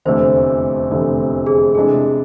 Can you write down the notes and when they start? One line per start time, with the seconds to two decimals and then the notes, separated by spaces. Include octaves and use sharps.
0.05 F1 E2 D3 A3 C5
0.91 F1 E2 D3 A3
1.47 G#4
1.75 C3 E3 G#3 D4 G#4 A4